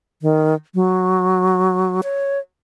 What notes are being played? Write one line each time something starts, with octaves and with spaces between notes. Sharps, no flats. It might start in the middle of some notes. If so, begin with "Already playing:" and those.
D#3
F#3
C#5